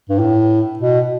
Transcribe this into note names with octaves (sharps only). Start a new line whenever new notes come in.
G2
A2
B2